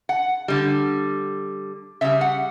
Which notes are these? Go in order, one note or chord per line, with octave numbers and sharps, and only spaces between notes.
F#5
D3 G3
C#3 G3 E5
F#5